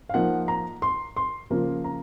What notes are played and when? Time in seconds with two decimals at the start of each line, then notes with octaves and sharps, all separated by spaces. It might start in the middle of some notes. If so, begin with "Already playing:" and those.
0.09 F5
0.14 F3 A#3 D#4 F#5
0.48 A#5
0.82 C6
1.16 C6
1.50 C#3 F3 A#3 F4
1.84 A#5